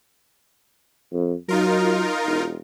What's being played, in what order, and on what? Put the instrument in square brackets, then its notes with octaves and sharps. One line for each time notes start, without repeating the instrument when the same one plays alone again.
[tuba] F2
[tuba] F#3 [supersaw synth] D#4 F4 A#4
[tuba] E1